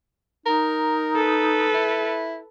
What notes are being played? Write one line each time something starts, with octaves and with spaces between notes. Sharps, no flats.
D#4 A#4
A4 B4
E4